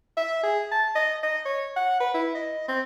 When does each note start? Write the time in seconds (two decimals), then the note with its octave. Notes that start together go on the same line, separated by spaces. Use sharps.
0.17 E5
0.43 G#4
0.71 A5
0.95 D#5
1.23 D#5
1.45 C#5
1.76 F#5
2.00 B4
2.14 E4
2.35 D#5
2.68 C4